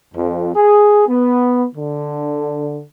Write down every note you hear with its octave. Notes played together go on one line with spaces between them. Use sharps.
F2
G#4
B3
D3